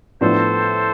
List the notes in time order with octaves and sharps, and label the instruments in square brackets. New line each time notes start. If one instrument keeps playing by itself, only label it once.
[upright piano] A2 F3 B3 D4 [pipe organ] A4 C5